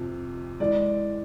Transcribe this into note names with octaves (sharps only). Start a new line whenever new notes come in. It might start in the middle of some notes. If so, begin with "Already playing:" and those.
Already playing: F2 C3
E3 G#3 D5